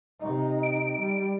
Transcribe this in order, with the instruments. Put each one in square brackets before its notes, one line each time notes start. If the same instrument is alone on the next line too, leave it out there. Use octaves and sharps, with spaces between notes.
[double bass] C3 D#4
[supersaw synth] D7
[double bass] G3